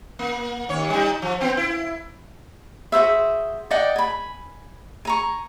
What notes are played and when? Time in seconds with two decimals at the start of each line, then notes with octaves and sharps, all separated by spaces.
0.19 A#3
0.69 D#2 C#5
0.90 G3 D#4
1.22 F3
1.41 B3 C4
1.57 E4
2.92 F#4 G#4 C5 E5
3.71 D5 D#5 F#5 G5
3.96 G#5 B5
5.05 G#5 A#5 C#6